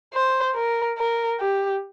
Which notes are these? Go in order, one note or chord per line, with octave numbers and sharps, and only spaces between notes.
C5
A#4
A#4
G4